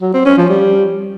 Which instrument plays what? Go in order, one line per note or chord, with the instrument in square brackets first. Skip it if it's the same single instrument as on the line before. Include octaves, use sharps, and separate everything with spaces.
[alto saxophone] F#3
C4
C#4
F3
G3